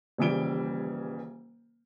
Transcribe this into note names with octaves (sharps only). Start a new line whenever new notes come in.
D#1 C#3 E3 G3 D7 G7